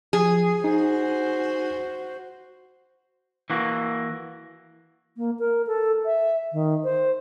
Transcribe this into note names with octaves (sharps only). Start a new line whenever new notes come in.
F3 G#4
D#4 F#4 C5
E3 A#3 F#4
A#3
A#4
A4
E5
D#3
C5